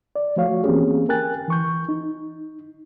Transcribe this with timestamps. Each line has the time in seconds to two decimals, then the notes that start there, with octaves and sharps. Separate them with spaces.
0.16 D5
0.36 F3 A3 F#4 C#5 F5
0.64 E3 A#3 C4 C#4 G4 G#4
1.09 A#4 G5 G#5 F#6 A6
1.48 E3 C#6 G6
1.89 D#4